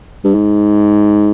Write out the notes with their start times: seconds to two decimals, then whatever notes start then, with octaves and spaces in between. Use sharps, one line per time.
0.24 G2
0.34 G#2